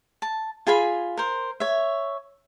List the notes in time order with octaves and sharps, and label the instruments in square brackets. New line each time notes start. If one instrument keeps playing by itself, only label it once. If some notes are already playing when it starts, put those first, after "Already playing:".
[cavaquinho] A5
F4 G#4 G#5 B5
A#4 C5
C#5 E5